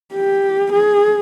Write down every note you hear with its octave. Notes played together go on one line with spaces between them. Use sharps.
G4
G#4